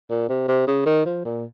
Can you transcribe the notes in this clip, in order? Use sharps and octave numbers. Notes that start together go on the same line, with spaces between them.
A#2
C3
C3
C#3
D#3
F3
A#2